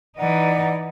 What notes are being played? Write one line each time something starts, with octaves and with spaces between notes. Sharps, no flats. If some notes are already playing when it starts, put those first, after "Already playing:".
E3 D#4 D5 F#5